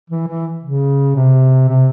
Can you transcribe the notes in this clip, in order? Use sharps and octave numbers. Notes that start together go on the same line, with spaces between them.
E3
E3
C#3
C3
C3